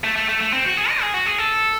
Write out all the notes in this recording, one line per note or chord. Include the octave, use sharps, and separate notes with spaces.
A3
A3
A3
A3
C4
F#4
G#4
D#5
G#4
F#4
G#4
A4